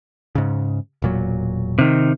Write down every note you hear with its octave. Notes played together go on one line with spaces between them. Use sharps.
G#2 C#3
E1 A#2 F#3
C3 D#3